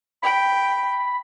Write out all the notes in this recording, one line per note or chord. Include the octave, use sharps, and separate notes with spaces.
G5 B5